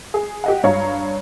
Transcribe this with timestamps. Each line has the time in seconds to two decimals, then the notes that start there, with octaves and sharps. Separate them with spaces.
0.14 G#4
0.44 G4 D#5 F#5
0.63 G2 C#5 F5 A#5